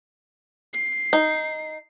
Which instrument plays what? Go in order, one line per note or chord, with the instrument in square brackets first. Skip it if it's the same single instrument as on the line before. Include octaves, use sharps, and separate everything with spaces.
[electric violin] C7
[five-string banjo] D#4